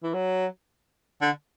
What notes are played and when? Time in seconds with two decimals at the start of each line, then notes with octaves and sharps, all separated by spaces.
0.03 E3
0.14 F#3
1.21 D3